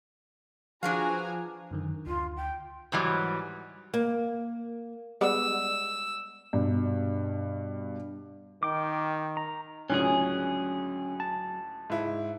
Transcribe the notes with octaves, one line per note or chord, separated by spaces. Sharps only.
F3 D4 F#4 G#4 B4 F5 G#5 A#5
F#2 D3 D#3
D2 F4
G5
G#2 E3 F#3 G3
A#3
G3 G#3 B3 E6
G2 B2
D#3 G5 D6
A#5
C#2 A2 D3 F#3 C#4 G#4
A5
G#2 E4